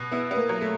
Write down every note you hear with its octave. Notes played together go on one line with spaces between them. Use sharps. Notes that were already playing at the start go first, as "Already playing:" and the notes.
Already playing: B2
B3 E4
B3
A#3
F#3
A3